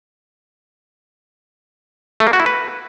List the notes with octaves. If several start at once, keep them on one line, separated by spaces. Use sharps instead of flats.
A3
A#3
F#4
E4
B4